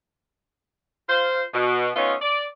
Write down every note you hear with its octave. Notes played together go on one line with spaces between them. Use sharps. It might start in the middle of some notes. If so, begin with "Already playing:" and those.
F4 C5
B2
A3 B3 C#4 D#4 F4
D5